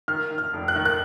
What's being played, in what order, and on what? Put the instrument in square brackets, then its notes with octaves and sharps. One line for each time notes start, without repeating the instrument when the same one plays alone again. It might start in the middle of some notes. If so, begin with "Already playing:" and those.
[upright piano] D#3 F6
D#3
F6
F1
F#6
D#3
F#6